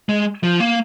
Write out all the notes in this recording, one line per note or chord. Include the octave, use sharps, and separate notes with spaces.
G#3
F3
A#3